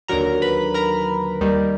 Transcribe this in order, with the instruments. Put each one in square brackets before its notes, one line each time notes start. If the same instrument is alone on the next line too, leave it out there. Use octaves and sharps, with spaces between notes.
[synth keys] D#2 D3 F#3 A#4 A#5
B4 B5
A#4 A#5
D#2 D#3 G3